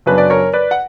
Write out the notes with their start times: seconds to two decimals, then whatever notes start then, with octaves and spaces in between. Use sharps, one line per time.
0.06 F#2 C#3 F#3 B3 D4 B4
0.18 D5
0.30 A#4 C#5
0.53 B4 D5
0.71 F#5